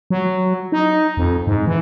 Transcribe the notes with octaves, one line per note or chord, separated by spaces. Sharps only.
F#3
D#4
F2
G#2
E3